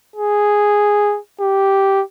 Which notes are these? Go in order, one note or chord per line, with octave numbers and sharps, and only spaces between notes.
G#4
G4